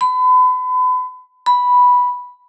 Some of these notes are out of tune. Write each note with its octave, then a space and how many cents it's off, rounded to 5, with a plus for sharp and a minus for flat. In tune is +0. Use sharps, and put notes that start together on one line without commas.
B5 +35
B5 -5